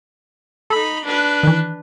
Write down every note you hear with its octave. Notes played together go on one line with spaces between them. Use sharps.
D#4 A4 B5
D4 B4
D#3 E3